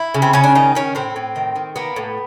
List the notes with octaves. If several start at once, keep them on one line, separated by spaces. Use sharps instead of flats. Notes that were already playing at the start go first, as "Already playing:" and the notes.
Already playing: E4
C#3
C4
C#3 C#4
D4
D#3 D#4
D#3 C#4
A2 C4
A2
D#3
D#3
A#3 B3
A2